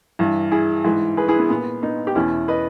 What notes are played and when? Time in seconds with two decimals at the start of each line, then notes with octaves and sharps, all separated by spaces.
0.19 G2 E3
0.51 E4 G#4
0.84 G#2 E3
1.17 G#4 B4
1.28 E4 G#4
1.39 B3
1.50 A#2 B3
1.83 B3 D#4
2.07 G4
2.15 E2 B2 C#4 E4
2.48 B4 D#5